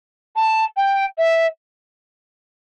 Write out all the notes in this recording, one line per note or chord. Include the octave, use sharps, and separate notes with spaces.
A5
G5
E5